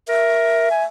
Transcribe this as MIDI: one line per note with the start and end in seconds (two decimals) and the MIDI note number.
0.09 0.70 70
0.09 0.85 76
0.71 0.84 80